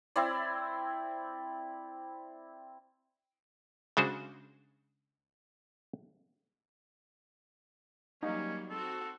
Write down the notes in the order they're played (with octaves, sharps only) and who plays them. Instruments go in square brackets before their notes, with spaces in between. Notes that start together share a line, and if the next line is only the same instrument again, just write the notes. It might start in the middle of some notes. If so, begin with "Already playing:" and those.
[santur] C4 E4 D5
[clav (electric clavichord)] C#3 G#3 D4 F#4 C5
[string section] F#3 G3 A#3 [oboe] C#4 [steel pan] D#4
[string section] C4 F#4 [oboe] A4